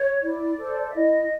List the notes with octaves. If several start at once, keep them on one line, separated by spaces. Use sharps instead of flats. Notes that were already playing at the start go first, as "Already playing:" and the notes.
Already playing: C#5
E4 D5
A4 C5
E5
E4 D#5